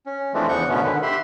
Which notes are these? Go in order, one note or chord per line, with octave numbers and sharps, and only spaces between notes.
C#4
E3 F3 G#3 A3 C4 D4
E2 C#3 F3 F#5 C#6 G6
G#2 B2 D3 A3 B3 C#4
D3 D#3 B4
G4 E5 B5 C6